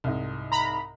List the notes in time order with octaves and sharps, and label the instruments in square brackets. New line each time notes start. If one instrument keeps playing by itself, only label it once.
[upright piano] C2 G#2
[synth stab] A#5 B5